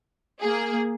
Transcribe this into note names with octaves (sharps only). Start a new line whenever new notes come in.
A#3 G#4